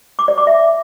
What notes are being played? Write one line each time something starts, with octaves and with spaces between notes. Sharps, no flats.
D6
D5
D6
E5